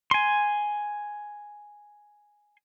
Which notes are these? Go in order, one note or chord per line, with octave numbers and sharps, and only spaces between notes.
G#5 C6